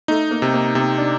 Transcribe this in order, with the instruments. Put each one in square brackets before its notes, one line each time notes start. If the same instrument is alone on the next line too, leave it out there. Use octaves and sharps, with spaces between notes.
[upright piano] A3 [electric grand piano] D#4
[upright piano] A#3
[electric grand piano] C3
[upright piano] A#3
[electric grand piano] C3 [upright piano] C4
[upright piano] D4